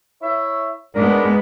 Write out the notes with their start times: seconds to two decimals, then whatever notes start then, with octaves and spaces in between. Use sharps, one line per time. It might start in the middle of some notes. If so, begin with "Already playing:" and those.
0.22 E4 C#5 E5
0.95 G#2 G#3 B3 D4 A#4